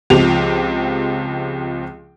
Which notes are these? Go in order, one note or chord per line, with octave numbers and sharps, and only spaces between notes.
C#2 F3 C4 G4 F7